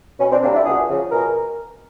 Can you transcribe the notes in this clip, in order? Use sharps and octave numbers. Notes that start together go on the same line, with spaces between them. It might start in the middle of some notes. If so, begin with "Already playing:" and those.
B2 C#4
C4 D4
G3 A#3 C4 D4
D4 E4
C#2 F#4 G#4
C#3 F3
B2 G#4 A#4